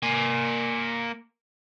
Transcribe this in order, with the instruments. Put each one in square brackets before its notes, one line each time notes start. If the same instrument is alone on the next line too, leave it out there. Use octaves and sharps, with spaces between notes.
[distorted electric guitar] A#3 G#5